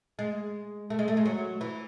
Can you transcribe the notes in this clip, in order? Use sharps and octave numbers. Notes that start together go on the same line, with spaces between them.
G#3
A3
G#3
A3
G#3
F#3
E3